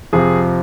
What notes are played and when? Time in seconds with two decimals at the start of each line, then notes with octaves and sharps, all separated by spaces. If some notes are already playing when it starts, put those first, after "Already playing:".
0.13 F2 C3 F3 G#4